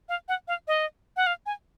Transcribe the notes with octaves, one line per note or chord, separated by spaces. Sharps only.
F5
F#5
F5
D#5
F#5
F5
G#5